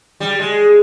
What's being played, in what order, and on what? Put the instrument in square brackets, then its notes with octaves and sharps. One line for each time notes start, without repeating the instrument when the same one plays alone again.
[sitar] G3
G#3